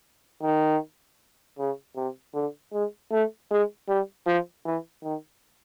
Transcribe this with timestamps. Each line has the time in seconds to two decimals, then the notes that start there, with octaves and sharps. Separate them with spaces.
0.43 D#3
1.59 C#3
1.96 C3
2.34 D3
2.73 G#3
3.12 A3
3.51 G#3
3.88 G3
4.26 F3
4.65 E3
5.03 D#3